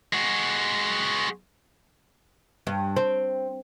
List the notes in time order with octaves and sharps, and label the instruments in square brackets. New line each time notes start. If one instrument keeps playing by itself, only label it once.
[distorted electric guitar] G#3 F#4
[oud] G2
C4